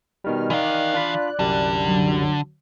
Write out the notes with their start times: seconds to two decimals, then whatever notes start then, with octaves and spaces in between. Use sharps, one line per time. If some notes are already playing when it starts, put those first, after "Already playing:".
0.24 B2 D#3 G3 F6
0.50 D#3 E3 D5 F5 F#6
0.94 D4 F4 B5
1.39 C2 F#2 D3 G3
1.88 F#3